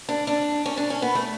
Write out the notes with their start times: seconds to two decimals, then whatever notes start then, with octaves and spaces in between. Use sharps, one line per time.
0.09 D4
0.27 D4
0.66 C#4
0.77 D4
0.90 C#4
1.02 B3
1.15 A3